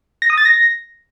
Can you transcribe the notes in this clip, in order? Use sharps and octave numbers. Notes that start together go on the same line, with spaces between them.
A#6
D#6
A6
A#6